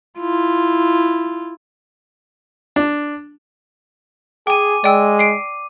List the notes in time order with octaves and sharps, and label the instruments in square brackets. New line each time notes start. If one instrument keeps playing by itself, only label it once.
[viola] E4 F4
[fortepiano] D4
[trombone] G#4 [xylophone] G5 G#5 [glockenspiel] D6 D#7
[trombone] G#3 [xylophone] D5 G5 E6
[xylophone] C7 D7